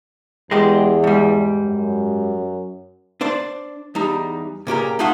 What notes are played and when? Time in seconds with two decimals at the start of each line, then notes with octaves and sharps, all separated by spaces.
0.51 E2 G#3 G4
1.04 G#2 G3
1.64 F#2
3.21 D4 C5 D5
3.95 E2 G3 D#4
4.67 A#2 C#3 G4 A#4
4.99 G#3 A3 D#4 F#4 F5 F#5